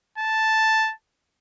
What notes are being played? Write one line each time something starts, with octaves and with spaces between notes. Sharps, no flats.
A5